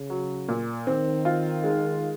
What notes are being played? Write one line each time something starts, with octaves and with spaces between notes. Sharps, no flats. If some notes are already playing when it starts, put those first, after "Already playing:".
Already playing: C#3
F#3
A#2
D#3 C4
F4
G#3